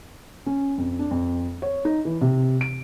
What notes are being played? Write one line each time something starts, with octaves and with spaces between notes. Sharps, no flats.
C#4
F2
D4
F2
C#5
D#4
E3
C3
D7